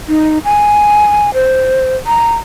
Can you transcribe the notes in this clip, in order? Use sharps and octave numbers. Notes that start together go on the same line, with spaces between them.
D#4
G#5
C5
A#5